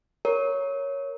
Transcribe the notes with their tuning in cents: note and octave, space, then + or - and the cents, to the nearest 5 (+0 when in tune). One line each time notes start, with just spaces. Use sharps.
A#4 +0 C#5 +0